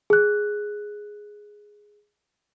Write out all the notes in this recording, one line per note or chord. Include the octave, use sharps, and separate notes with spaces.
G#4 F#6